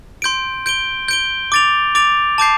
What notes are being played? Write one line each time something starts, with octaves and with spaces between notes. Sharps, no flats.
C6 G6 D7
G6 D7 G7
G6 D7 G7
D6 A6 D7 F7
D6 A6 D7 F7
A5 D6 G6 C7